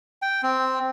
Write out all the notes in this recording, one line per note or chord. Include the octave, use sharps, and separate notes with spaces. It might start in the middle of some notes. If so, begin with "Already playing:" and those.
G5
C4